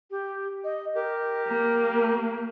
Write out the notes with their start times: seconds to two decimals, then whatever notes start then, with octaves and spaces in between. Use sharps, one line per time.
0.11 G4
0.64 D#5
0.95 G4 A#4
1.48 A#3